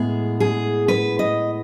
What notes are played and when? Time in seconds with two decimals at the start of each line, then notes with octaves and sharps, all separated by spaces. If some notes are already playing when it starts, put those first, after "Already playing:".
Already playing: A2 G#3 B3 G#4
0.40 G#4
0.88 B4
1.19 D#5